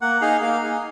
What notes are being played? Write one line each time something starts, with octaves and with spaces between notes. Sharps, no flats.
A#3 F#5
D#4 G#4 F5
A#3 F5
D#4 G#4